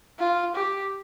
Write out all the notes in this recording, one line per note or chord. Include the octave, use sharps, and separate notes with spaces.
F4
G4